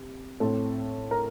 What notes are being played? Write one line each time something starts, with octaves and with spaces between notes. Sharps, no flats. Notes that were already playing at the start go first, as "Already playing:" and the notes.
Already playing: C3
A2 A3 C4 A4
A#4